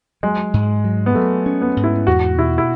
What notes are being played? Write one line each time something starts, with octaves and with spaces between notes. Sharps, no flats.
F#3 G#3
G#2
F#3
B3
F#3 A3
C#4
B3
G#2
E4
E2 F#4
B2 E4
E4